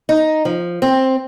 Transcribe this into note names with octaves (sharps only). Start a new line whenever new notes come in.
D#4
F3
C4